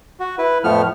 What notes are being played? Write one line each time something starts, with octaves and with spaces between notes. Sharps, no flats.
F#4
E4 B4
F2 A2 F3 A3 B3 F6